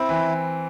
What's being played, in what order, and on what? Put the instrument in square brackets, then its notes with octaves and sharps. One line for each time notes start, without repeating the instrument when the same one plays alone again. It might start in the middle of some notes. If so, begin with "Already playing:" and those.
Already playing: [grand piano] C4 [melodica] E4
[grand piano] E3